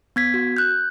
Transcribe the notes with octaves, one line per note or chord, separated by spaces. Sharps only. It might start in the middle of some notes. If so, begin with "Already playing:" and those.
B3 G#6 B6
F#4
F#6 G6